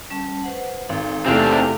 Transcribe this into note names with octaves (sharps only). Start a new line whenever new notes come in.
G3 C#4 A5
B4 C5 F#5
G#1 D#4 A4
E2 C3 A3 C4 D4 F5